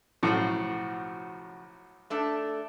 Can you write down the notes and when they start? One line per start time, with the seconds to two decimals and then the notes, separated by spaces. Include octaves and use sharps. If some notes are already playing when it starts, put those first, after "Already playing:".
0.23 B1 A2 C#3 F3 F#4
2.10 A3 D4 A4